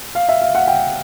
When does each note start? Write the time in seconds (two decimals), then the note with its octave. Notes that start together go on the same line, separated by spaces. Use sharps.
0.15 F5
0.29 E5
0.42 F5
0.55 F#5
0.68 G5